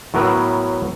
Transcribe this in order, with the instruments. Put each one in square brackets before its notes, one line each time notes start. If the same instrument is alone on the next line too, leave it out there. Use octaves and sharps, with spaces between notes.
[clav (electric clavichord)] A2 F#3 B3 A#4 B4 E5